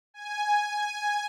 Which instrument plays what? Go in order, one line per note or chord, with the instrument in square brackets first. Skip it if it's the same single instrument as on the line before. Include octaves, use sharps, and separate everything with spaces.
[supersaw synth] G#5